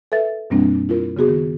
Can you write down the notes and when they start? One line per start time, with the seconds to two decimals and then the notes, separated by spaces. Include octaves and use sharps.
0.12 A4 B4 E5 A6
0.50 F#2 B2 G3 A#3 C4 D4
0.89 E4 F4 A#4
1.17 C#3 B3 F#4 G#4
1.28 D#3